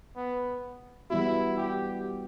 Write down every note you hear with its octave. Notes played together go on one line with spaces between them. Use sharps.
B3
E3 G3 B3 E4 F#4
G4